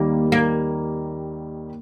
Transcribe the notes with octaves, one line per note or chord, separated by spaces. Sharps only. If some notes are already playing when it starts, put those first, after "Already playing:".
Already playing: D#2 D#3 G3 A#3
A#3